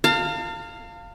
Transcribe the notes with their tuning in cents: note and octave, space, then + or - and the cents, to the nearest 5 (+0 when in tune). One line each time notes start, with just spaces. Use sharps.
F5 +0 A5 +45